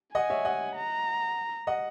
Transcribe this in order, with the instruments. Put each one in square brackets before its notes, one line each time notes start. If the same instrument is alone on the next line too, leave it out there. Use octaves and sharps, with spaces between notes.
[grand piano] D#5 F#5 [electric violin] G#5
[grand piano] C#5 E5
D#5 F#5
[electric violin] A#5
[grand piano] D#5 F#5